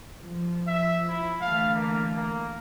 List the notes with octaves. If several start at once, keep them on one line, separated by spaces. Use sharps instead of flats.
F3
E5
E4
D3 E3 A3 F5
A#3
A#3